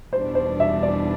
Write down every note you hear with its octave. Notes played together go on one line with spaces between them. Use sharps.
E2 B2 G3 D4 C5
C5
E5
D5